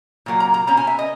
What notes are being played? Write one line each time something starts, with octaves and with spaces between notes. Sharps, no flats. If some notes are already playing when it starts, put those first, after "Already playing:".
A#2 F#3 A#3
A#5
A#5
B2 A#3 C#4 A#5
G#5
E5
D#5